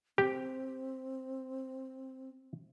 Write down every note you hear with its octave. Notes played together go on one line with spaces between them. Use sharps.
C4 G4